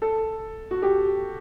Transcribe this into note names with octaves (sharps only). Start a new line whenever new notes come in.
A4
F#4
G4